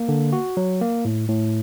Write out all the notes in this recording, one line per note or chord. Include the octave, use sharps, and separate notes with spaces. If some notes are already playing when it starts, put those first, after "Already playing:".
Already playing: A#3
D3
F#4
F#3
A#3
A2
A2